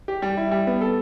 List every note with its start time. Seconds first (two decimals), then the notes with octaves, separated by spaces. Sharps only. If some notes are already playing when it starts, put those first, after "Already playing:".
0.08 G4
0.22 G3
0.37 E4
0.51 G3
0.67 B3
0.81 A4